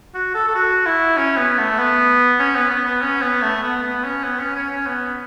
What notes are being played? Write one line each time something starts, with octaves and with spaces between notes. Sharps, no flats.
F#4
A4
A4
F#4
E4
C#4
B3
A3
B3
C#4
B3
B3
B3
C#4
B3
A3
B3
B3
C#4
B3
C#4
C#4
C#4
B3